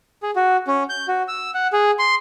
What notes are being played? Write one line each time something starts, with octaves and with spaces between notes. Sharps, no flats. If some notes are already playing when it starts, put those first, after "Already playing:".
G#4
F#4
C#4
G6
F#4
E6
F#5
G#4
C6